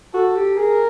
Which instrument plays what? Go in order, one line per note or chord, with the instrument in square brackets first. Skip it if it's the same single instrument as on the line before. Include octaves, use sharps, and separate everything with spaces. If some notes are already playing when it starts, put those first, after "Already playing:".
[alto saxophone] F#4 [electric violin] A4
[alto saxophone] G4
[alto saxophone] G#4 [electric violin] A#4